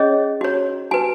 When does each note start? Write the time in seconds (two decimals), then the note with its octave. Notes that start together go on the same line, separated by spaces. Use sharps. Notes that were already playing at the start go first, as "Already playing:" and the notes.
Already playing: C#4 G#4 C#5 D#5
0.41 F#4 C#5
0.91 F#4 B4 G#5